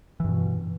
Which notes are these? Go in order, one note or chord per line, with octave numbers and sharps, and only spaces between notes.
G2 B2 E3